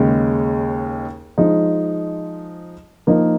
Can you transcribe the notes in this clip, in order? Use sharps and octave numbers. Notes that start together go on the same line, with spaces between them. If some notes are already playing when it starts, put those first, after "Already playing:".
Already playing: D#2 C#3 G#3
F3 G#3 D#4
F3 A#3 D#4 A#4